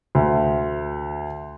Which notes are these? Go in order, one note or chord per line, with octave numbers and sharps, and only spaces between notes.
D2